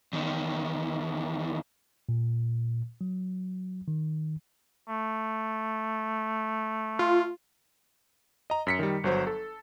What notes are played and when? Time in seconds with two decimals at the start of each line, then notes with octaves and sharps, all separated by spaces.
0.13 E2 D#3
2.09 A#2
3.01 F#3
3.88 D#3
4.88 A3
6.99 F4
8.50 D#5 A#5
8.67 F#2 B6 C#7
8.79 D#3 G3
9.04 G1 F#3 C5
9.27 A4